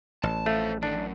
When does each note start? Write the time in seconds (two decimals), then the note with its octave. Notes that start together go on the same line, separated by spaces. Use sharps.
0.23 A1 A5
0.46 F2 A3 C5 F5
0.83 A2 D#3 D4 A4
0.96 F#2